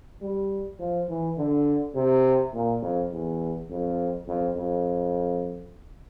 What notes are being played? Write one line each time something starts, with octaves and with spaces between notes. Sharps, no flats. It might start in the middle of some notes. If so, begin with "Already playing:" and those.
G3
F3
E3
D3
C3
A#2
F2
E2
F2
F2
F2